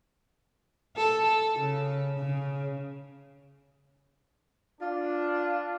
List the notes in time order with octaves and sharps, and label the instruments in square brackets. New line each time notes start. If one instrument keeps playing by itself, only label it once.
[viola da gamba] A4
A4
C#3
C#3
[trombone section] D4 [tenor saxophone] F4